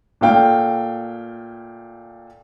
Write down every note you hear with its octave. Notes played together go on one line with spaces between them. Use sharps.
A#2 A3 F5 G5